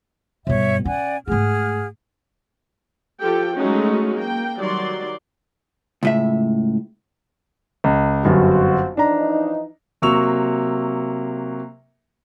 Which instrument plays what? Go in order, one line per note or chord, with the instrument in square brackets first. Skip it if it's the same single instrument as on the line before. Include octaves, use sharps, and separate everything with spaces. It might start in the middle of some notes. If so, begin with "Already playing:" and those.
[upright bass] G2 B2 [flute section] C#5 E5
[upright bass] C#4 [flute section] D5 F#5 G#5
[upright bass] G#2 A3 [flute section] G#4 F#5 F6
[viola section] F3 F4 G4 A4 G5
F#3 G#3 A3 C#4 D#4 F#4
A#3 G5
D#3 F#3 G3 D5 C6
[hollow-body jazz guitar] C#2 A2 E5
[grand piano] C#2
[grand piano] G1 F#2 [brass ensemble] C4 F4 F#4
[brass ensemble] E3 F3 D#4 [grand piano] D4 A#5
[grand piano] C3 F#3 A#3 C#6 E6 F7